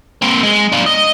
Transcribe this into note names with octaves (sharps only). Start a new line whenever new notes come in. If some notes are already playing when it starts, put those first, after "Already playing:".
A#3 C4
G#3
D4 F4
D#5